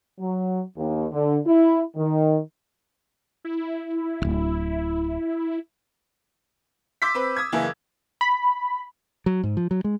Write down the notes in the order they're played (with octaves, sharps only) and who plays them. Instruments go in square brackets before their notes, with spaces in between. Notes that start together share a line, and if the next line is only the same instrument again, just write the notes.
[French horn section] F#3
D#2
D3
E4
D#3
[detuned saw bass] E4
[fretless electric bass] D1 G1
[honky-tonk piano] C6 D6 E6 G6 B6
C4 B4
D#6 E6 G#6
F#1 E3 A#3 E4 G#4
[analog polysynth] B5
[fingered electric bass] F#3
G#2
F3
F#3
G#3